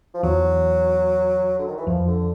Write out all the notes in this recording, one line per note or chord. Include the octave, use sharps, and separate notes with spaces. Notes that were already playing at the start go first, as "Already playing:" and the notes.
F3
E2 F#3
D3
D#3
E3
F2 F3
D3